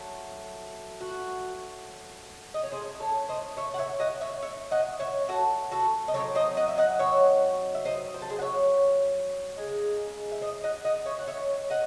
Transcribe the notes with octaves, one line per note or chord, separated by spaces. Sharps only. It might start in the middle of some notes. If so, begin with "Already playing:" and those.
Already playing: F#3 A3
F#4
D#5
C#5
A2 G#3 C#4 G#4 C5
A4 C#5
C5 D#5
C#5 E5
F#5
C#5 E5
D#5 F#5
C#5 E5
C#5 E5
D#5 F#5
C#5 E5
F#4 A4
F#4 A4
D#5
F#3 A3 C4 D#4 A4 C#5
C5 D#5
D#5 F#5
E5
D#5 F#5
C#5 E5
E5
C5 D#5
C5
A4
G#4 C5
F#5
C#5 E5
C#3 G#3 D#4
E5
C5 D#5
D#5 F#5
D#5 F#5
C#5 E5
F#5
C#5 E5
D#5 F#5